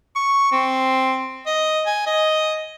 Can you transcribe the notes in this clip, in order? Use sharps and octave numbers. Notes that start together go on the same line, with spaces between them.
C#6
C4
D#5
G#5
D#5